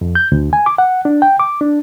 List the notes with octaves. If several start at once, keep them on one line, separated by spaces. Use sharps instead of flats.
F2
G6
D2
G#5
D6
F#5
D4
G5
D6
D4